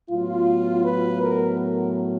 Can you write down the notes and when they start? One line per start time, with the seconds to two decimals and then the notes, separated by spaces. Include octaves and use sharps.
0.10 A2 F#3 B3 F4
0.85 B4
1.22 A#4
1.60 A#4